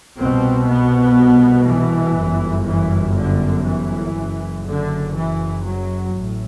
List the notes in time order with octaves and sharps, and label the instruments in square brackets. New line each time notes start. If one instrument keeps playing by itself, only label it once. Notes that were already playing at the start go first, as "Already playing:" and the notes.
[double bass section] C2 B2 C4
B3
E3
G1 F#2
E3
D3
E3
F#1 F#2
D3
E3
F#3
A1 A2